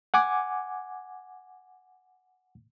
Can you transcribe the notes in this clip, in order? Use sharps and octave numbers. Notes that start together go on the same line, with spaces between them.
F#5 G#5 D6 G#6